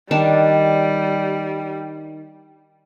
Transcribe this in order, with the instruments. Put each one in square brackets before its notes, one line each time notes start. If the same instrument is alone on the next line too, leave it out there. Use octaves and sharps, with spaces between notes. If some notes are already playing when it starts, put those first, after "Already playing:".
[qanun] D#3 D4 A5 [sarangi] G3